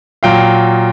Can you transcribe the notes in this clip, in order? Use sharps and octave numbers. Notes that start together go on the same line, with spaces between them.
A#2 F#3 F5 G5